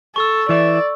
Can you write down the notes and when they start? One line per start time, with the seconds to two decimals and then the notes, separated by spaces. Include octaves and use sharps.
0.16 A4 C#6 E6
0.49 E3 D5 E5